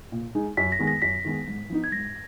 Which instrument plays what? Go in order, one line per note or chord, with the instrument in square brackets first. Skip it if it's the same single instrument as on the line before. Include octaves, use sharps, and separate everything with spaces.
[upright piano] A#2
G#3 D#4 G#4
[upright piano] F#2 [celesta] B6
[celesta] A#6
[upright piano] D#3 G#3 B3
[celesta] A#6
[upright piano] F#2 [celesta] B6
[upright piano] D#3 G#3 B3
G#2
F3 B3 D#4
[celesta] G#6
[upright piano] G#2 [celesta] A#6